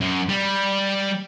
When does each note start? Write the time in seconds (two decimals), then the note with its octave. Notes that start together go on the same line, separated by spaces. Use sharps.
0.01 F#2
0.29 G3